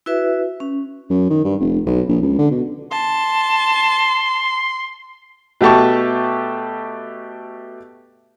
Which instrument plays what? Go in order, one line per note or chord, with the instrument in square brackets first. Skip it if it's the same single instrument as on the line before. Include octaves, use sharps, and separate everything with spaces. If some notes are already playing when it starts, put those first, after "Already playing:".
[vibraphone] E4 F#4 B4 E5
C#4
[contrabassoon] F#2
D#3
G2
F1
B1
A#1
C#2
D3
B2
[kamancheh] A5 [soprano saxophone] C6
[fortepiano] B2 A3 G4 A5 C#6